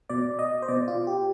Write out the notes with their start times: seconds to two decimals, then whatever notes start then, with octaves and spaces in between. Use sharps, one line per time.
0.09 B2 D5
0.39 D#5
0.62 C5
0.68 B2 D5
0.88 F4
1.07 G4